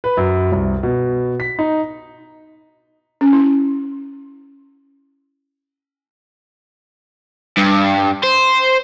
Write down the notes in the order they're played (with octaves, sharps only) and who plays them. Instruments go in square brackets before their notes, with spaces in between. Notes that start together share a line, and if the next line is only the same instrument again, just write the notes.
[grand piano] B4
F#2
C2
B2
B6
D#4
[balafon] C#4
E4
[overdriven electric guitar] G2
C5